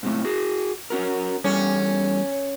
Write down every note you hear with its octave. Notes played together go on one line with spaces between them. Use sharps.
G#2 C3 A3
F#4 G#4
C#4 F#4 A#4
E2 G3 C#4 A4